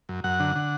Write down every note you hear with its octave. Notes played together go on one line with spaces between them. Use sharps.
F#2
F#2 F#5
D3
D3